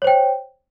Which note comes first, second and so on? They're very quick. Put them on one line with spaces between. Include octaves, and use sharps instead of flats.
C#5 C5 G5